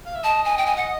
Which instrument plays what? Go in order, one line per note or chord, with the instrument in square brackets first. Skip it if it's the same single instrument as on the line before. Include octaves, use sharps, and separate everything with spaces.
[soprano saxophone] F5
E5
[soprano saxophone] D#5 [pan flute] A5
[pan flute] G#5
G5
G#5
F#5